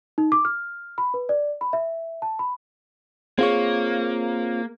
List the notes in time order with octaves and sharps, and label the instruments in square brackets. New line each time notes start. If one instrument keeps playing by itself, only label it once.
[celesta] D#4
D6
F6
B5
B4
D5
B5
E5
A5
B5
[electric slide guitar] A#3 [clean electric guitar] C4 F4 C#5 [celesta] G#4